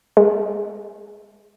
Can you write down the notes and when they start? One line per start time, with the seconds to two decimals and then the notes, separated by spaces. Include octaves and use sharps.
0.17 G#3